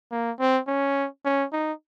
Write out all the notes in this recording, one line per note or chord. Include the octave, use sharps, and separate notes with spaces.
A#3
C4
C#4
C#4
D#4